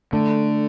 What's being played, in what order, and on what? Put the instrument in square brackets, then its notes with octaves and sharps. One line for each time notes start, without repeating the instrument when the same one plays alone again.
[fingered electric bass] D3 [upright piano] A3